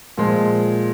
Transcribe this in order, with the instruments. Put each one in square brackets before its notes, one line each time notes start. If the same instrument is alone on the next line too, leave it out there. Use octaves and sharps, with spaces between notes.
[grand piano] A#2 F3 G#3